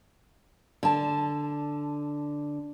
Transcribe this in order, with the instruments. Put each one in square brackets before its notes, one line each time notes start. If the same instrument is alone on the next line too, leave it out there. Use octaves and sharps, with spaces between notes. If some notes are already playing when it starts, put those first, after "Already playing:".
[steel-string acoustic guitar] D3 A5